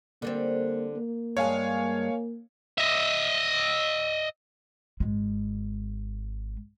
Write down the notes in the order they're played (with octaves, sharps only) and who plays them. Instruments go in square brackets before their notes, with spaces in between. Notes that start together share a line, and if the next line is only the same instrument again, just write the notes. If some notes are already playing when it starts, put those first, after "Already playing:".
[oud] D3 G3 C4 [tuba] A#3
[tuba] A#3
[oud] G2 G#3 [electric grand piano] C#5 F5 G#5
[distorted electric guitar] D#5 E5
[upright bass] G#1 G#3